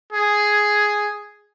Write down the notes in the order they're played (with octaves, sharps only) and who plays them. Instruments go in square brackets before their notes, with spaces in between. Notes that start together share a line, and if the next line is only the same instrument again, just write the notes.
[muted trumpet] G#4